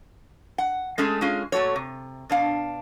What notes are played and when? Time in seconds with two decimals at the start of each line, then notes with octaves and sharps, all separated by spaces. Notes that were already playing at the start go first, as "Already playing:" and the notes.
0.58 F#5
0.98 G#3 A3 C#4 G#4 A4
1.21 G#3 C#4 F4 G#4
1.52 A#2 A3 F#4 A4 C#5
1.76 C3
2.29 B2 D4 F5